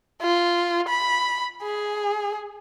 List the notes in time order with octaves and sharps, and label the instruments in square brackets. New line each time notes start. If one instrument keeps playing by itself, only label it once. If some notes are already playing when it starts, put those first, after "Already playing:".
[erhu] F4
B5
G#4